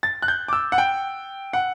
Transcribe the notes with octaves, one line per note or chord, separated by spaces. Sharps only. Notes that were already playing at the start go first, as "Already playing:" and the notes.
A6
F#6
G6
D6
E6
F#5
G5
F#5